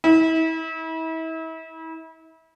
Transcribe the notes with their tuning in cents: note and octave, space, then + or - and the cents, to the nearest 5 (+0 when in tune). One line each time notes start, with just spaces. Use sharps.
E4 -35